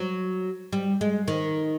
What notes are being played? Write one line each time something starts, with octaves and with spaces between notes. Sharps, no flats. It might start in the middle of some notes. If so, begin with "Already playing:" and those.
Already playing: F#3
G3
G#3
D#3